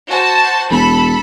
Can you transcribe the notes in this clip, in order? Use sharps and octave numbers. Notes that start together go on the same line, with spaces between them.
F#4 C5 A5
E1 A4 B5